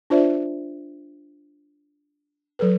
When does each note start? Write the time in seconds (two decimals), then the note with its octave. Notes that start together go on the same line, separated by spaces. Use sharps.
0.10 D4 F4 C5 D5 E5
2.59 F#3 A4 B4